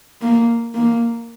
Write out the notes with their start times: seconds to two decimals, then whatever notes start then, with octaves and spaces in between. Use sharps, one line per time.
0.21 A#3
0.74 A#3